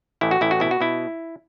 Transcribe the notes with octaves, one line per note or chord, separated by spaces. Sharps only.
A1 E4
F#4
A1 E4
F#4
B2 E4
F#4
B2 E4